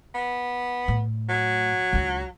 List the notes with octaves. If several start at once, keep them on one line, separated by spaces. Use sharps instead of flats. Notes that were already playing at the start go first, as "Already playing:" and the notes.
B3
A2
F#3
C#2 D4